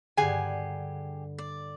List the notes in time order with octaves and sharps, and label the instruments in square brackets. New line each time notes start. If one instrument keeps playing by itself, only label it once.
[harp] G2 D3 [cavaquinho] G4 G#4 F#5 [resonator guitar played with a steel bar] G#5
[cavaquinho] D5